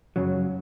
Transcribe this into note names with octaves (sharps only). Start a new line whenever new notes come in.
F#2 C#3 F#3